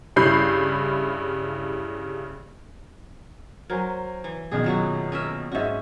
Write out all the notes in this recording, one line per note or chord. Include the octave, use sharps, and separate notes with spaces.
G2 C#3 E4 B5 G6 C7
F#3 A#4 C5 G#5
E3
F#2 B2 D#3 G#4
A#2 F#3 F#4
C#4 A#4 E5
G#2 C#4 F#4 D#5 E5